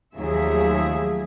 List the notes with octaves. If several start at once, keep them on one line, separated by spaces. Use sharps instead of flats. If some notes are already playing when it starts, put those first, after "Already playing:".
D#2 F3 F#3 A3 G#4 E5